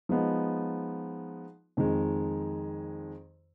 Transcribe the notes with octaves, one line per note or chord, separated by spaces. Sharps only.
F3 G#3 B3 D#4
F2 D#3 G#3